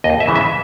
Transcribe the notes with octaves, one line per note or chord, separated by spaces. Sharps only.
D#2 D#5
E5
C#3 E3 G#3
E5